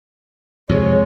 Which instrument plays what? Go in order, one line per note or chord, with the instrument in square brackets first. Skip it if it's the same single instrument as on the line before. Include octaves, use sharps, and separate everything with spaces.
[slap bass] F2 C3 F3 [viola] G#3 [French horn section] C#5